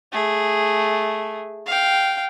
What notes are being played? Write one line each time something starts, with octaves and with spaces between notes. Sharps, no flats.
A3 G#4
F5 G5